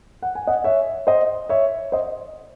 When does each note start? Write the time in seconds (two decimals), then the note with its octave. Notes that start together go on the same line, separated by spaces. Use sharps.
0.22 F#5
0.35 G#5
0.47 D#5 F#5
0.64 C#5 E5
1.07 C5 D#5
1.49 C#5 E5
1.92 C5 D#5